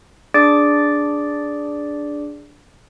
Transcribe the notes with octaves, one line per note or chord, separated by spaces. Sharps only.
D4 G#4 D5 D6 A6 D7